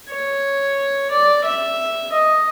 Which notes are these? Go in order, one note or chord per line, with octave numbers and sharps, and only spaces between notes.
C#5
D5
E5
D#5